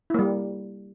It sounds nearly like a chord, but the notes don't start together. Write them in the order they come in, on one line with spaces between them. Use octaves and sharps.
E4 A#3 G3